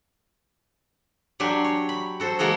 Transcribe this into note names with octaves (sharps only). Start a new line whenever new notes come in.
F#3 D4 G4 G#5 C6
C#5
B5
F#4 A4 C5
G#3 A#3 F#4 G#4 A4